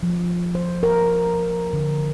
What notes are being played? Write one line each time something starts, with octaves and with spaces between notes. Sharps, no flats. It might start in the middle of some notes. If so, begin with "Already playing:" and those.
F3
C5
A#4
D3